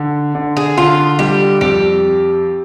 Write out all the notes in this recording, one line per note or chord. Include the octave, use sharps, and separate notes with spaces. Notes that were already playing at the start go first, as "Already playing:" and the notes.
Already playing: D3
D3
G#4
D3 F4
G3 G4
F2 G4